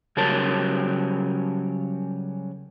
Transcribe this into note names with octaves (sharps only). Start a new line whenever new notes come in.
C#3 F#3 G3 C#4 A#4 A5